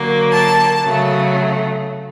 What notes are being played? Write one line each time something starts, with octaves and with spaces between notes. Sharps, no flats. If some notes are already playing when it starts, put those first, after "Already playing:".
Already playing: D3 F#3 A#3
A5
C#3 F#3 A3